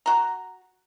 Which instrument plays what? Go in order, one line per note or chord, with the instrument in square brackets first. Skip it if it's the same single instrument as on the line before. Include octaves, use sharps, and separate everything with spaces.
[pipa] F#4 A#5